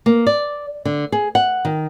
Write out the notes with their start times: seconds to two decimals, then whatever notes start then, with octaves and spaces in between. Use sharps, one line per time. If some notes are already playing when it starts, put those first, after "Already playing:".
0.06 A#3
0.27 D5
0.85 D3
1.12 G#4
1.35 F#5
1.65 D#3